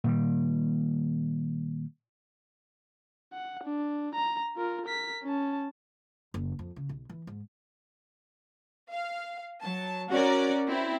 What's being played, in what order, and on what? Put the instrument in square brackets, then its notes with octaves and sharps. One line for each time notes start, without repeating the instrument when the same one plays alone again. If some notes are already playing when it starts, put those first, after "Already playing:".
[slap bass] A#2 D#3 G3
[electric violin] F#5
D4
A#5
F4 A#4
A#4 B6
C#4 A5
[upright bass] F#1
F2
C#3
B1
E3
G#2
[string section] F5
F#3 A5
C#4 F#4 A#4 D5
C4 E4